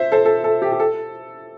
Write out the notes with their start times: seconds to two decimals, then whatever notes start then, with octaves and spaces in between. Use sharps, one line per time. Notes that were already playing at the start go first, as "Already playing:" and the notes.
Already playing: C5 E5
0.12 A4 C5
0.25 A4
0.44 A4
0.62 G4
0.72 G4
0.80 A4